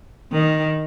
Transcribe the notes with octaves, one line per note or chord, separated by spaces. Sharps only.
D#3